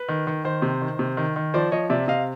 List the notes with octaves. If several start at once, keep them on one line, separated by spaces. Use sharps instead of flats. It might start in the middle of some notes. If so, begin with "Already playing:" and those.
Already playing: B4
D#3
D#3
D#3 C5
C3
D#3
C3
D#3
D#3
F3 C5 D5
F3 C#5 D#5
C3 D5 E5
C3 D#5 F5